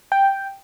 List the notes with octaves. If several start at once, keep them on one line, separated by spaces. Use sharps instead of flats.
G5